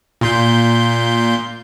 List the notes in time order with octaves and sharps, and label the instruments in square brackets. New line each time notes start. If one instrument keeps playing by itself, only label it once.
[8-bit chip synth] A#2 C6 G6